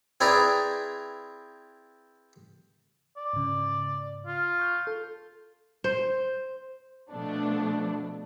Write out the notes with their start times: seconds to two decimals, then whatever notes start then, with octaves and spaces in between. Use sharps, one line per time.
0.21 C4 E4 G#4 B4 D5 A#5
3.17 D5
3.33 G#2 C#3
4.27 F4
4.59 C#6 G6
4.87 A4
5.84 C5
7.11 B2 F3 A3 B3 D4